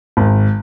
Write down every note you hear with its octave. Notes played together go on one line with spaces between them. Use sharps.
G#1